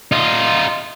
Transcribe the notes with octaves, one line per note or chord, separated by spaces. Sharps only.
D#4 F4